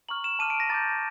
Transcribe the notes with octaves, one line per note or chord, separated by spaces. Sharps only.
A#5 C#6 F6 F#7
E7
A5 D6 F6 D#7
D7
A#6
A#5 D6 G6 A6